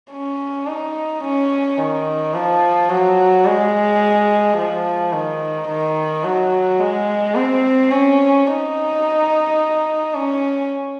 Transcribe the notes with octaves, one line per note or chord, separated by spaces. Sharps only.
C#4
D#4
C#4
D#3
F3
F#3
G#3
F3
D#3
D#3
F#3
G#3
C4
C#4
D#4
C#4